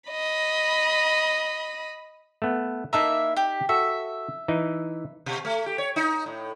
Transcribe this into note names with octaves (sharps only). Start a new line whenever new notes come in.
D#5 B5
A3 B3
A#3 D#4 E4 E5 A5 A#5
G4
F#4 A4 E5
E3 D#4
B2
A3
G4
C#5
D#4
A2